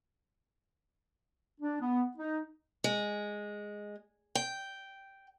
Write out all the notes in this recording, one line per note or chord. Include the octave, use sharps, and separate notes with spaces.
D4
B3
D#4
G#3
G5